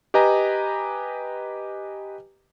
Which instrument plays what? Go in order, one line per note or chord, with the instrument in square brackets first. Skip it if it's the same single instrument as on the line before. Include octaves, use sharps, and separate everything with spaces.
[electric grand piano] G4 B4 D#5 G#5 A#5